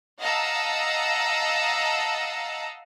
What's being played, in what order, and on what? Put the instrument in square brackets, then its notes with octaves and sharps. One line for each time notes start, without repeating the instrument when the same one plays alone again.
[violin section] D#5 F5 F#5 A5 A#5 E6